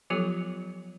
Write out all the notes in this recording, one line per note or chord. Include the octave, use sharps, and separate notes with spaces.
F3 F#3 B3 F4 G4 A4